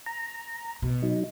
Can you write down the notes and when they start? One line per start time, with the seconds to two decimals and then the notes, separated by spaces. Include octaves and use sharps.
0.06 A#5
0.82 B2
1.03 F#3 D#4